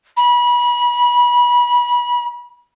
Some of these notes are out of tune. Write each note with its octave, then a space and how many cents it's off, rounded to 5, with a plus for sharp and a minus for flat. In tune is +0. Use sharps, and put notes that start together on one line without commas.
B5 -30